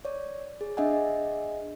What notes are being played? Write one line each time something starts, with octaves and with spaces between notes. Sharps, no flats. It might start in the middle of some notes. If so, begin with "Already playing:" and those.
C#5 D5
G#4
D4 G#4 D#5 E5 F#5 G#5